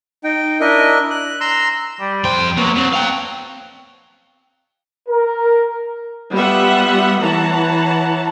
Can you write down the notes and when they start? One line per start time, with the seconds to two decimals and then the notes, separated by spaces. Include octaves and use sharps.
0.24 D#4 G5
0.60 D4 E4 A#4 D#5
1.10 F#6
1.41 A#5 C6 E6
2.00 G3
2.24 F2 C5 G5
2.58 F#3 A#3 B3
2.76 F#3 B3 C4
2.93 F5 G5
5.09 A#4
6.33 G3 B3 F4 E5 F#5
7.21 E3 C#5 F#5 A5 A#5